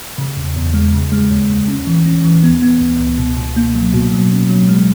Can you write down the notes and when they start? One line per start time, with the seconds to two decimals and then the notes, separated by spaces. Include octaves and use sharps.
0.18 C#3
0.37 E2
0.56 E2
0.74 G#3
0.93 C#3
1.12 G#3
1.30 D#2
1.49 D#2
1.68 C#4
1.87 E3
2.06 C#4
2.24 E3
2.43 B3
2.62 B3
2.81 C#2
2.99 C#2
3.18 B2
3.37 B2
3.56 A#3
3.75 F#3
3.93 B2
4.12 F#3
4.31 C#4
4.50 F#3
4.68 G#3